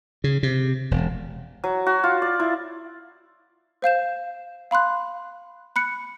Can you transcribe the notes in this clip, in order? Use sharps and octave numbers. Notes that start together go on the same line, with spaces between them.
C#3
C3
E1
F#3
F#4
F4
D5
E4
C5 F5 G6 E7
F5 B5 C6 F#6
B5 F#6 C#7